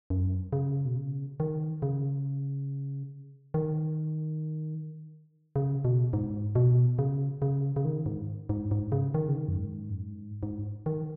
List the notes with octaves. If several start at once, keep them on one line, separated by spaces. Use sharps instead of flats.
F#2
C#3
B2
C#3
D#3
C#3
D#3
C#3
B2
G#2
B2
C#3
C#3
C#3
D#3
G#2
G#2
G#2
C#3
D#3
C#3
D#3
F#2
G#2
F#2
G#2
G#2
D#3